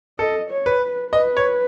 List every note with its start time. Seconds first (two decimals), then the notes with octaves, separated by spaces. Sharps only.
0.19 A4 D#5
0.50 C#5
0.66 B4
0.82 B4
1.12 B4 D#5
1.37 C#5